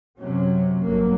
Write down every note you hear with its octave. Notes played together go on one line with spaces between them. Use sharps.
F#2 C3 F#3 C#4
G1 F#3 A#3